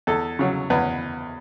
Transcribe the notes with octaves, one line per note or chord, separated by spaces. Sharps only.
E2 A4
C#3 F#3
E2 B4